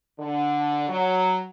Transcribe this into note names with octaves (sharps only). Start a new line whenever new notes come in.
D3
F#3